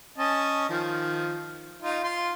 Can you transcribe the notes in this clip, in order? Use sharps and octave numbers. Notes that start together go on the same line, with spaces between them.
C#4 D#5 A5
D#3 F3
D#4 F4
F4 C6